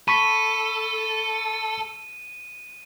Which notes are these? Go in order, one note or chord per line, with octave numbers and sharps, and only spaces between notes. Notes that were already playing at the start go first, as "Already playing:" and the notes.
A4 B5 C#6 B6 D#7